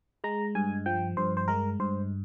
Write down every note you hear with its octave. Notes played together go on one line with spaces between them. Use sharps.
G#3 A#5
G2 G#5
F3 G5
G2 C5
C5
G#3 A#4
G2 C5